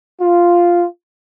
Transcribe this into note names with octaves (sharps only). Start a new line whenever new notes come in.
F4